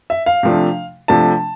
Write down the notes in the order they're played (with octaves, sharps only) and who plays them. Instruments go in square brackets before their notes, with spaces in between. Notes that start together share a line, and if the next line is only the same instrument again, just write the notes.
[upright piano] E5
F5
C3 F3 A3 D4
C3 F3 A3 D4 A5